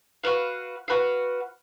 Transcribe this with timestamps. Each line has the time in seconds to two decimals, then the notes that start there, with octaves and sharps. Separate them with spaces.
0.23 F#4 B4 F5
0.88 F#4 B4 F5